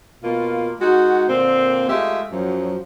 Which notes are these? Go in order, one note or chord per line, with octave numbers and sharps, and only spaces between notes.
B2 A#3 F4
G#3 D#4 F#4
A#2 D3 A#3 C4
G#3 A3 F4 G4 E5
F#2 F3 F#3